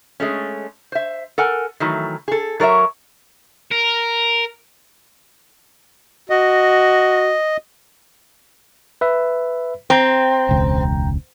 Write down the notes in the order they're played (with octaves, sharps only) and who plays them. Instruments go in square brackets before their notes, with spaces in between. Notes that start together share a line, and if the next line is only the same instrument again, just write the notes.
[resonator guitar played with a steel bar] G#3 A3 C#4
C5 E5
A4 A#4 F#5 G#5
D#3 E3 F#3 A3
G#4 A4
F#3 A#4 C#5 D5 E5
[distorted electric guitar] A#4
[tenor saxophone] F#4 [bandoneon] D#5
[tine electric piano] B4 E5
[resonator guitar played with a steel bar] C4 [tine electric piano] G5 A#5 G6
[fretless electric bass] E1 C#2